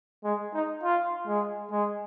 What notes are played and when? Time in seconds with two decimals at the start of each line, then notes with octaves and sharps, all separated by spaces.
0.24 G#3
0.54 D#4
0.83 F4
1.27 G#3
1.71 G#3